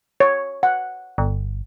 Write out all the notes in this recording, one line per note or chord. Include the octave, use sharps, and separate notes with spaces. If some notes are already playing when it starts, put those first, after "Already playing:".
C#5
F#5
G1